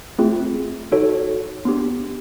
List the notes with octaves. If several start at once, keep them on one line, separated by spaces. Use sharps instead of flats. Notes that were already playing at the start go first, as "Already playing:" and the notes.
A3 C4 F4 G#4
D#4 F#4 A4 C#5
B3 D4 G4